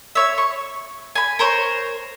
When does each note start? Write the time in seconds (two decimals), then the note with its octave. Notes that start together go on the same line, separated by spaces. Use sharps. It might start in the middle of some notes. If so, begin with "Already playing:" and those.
0.15 C#5 E5
0.38 C#6
1.15 G#5 B5
1.39 A#4 C5 C#5